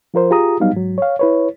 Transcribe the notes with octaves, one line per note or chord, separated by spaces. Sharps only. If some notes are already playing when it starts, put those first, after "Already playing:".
F3 F4 A#4 C5
F4 G4 G#4 A#5 D#6
F#3 G3 B3 D#4 F5
G#2 F#3
C#5 F5
E4 B4 C#5